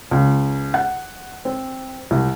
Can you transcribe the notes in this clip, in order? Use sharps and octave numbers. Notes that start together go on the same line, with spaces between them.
C#2
F#5
C4
C2